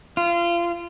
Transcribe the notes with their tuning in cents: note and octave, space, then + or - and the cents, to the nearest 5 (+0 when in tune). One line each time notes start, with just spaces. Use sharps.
F4 -30